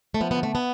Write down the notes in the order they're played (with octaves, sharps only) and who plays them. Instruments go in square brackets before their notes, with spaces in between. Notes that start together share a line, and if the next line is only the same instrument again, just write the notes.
[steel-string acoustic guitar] A3
F3 B3
B3
D3
A3
B3